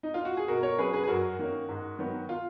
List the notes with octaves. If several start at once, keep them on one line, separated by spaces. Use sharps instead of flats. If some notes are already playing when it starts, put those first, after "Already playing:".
D#4
F4
F#4
G#4
B2 F#4 A#4
A#4 C#5
F#3 C#4 G#4 B4
G#4 B4
G#4
F#2 F#4 A#4
D#3 A#3 C#4
G#2
D#3 F#3 B3
F4